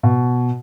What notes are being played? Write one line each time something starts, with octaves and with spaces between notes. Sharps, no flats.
B2